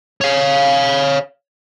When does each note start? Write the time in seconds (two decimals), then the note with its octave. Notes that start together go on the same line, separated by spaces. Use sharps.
0.21 C#5 F5